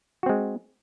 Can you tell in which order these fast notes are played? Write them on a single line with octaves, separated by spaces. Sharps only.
F#4 C4 G#3